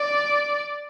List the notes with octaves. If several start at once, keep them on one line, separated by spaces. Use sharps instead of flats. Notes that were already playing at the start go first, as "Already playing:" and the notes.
Already playing: D5